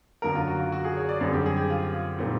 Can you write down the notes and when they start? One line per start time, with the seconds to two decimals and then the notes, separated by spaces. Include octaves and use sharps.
0.22 F#2 D3 F#3 A#3 A#4
0.35 F4
0.48 F#4
0.59 F4
0.72 F#4
0.85 G#4
0.97 C#5
1.09 D5
1.20 F#2 D3 G3 C4 G#4
1.33 G4
1.46 G#4
1.57 G4
1.70 F4
2.18 A#2 G3 C4 D#4